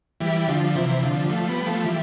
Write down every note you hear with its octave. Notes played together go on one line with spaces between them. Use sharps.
E3 G3
D3 F3
C3 E3
D3 F3
G3
F3 A3
G3 B3
F3 A3
E3 G3